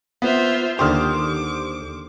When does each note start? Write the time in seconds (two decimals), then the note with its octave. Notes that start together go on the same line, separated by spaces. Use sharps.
0.22 B3 F4 C5 E5
0.79 D#2 D3 G4 C5 D6 D#6 F6